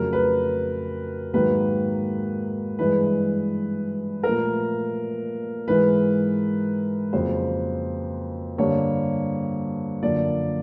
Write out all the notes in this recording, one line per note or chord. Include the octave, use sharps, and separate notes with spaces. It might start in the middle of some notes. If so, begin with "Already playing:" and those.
Already playing: F2 C#3 F#3 A3 A#4
B4
G#2 D#3 F#3 A#3 B4
G2 E3 G#3 B4
A#2 F3 A3 A#4
G#2 E3 G#3 B4
F2 C#3 F#3 A#3 C5
G2 D3 G3 A#3 C#5
F#2 D3 F3 A#3 D5